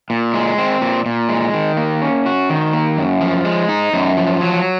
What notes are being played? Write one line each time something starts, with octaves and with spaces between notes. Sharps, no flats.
A#2
G#3
C4
A#2
A#2
G#3
D#3
A#3
C#4
F#4
D#3
A#3
F#2
F3
G#3
D#4
F#2
F3
F#3